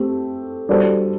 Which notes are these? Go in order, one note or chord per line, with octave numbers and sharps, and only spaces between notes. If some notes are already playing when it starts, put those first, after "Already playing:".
Already playing: A3 C4 G4
G3 D4 F#4 A4 C5